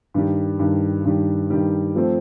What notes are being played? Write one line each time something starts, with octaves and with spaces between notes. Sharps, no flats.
G2 D#3 G3
G2 D#3 G3
G2 D#3 G3
G2 D#3 G3
F3 A3 C4